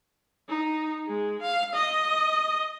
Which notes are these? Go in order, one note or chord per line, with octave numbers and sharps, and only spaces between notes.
D#4
G#3
F5
D#5